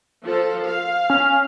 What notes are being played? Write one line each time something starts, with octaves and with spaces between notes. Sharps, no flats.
F3 A4
F5
C#4 F6